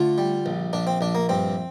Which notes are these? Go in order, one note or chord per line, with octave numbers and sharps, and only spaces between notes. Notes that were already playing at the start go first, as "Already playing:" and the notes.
Already playing: D3 A3 F4
G3
A#1
A#1 D4
C4
A#1 D4
A#3
G2 C4